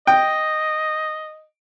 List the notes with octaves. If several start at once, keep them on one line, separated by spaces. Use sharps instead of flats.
D#5 G5